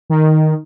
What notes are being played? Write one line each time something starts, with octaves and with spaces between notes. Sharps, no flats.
D#3